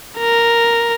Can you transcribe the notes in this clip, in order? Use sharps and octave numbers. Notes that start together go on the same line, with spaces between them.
A#4